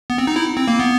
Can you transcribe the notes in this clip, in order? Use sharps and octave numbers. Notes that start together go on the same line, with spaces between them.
B3
C4
D#4
E4
C4
A#3
B3